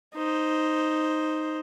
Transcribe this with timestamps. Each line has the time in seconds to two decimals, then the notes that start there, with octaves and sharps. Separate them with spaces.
0.15 D#4 C5